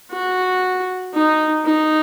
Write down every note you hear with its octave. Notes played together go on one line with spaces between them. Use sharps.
F#4
D#4
D#4